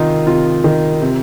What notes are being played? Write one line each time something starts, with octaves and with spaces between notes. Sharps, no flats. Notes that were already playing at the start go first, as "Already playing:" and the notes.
Already playing: C3 D#3 D#4 F4
C3 F4
D#3
C3